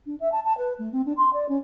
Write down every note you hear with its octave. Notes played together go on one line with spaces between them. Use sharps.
D4
E5
A5
A5
B4
A3
C4
D4
C6
D5
C#4